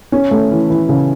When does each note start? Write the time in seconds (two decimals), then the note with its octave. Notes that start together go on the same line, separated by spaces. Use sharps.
0.12 C#4
0.31 A3
0.51 E3
0.70 E3
0.89 C#3